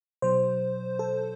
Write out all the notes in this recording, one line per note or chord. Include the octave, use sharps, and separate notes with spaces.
B2 F#3 C5
A4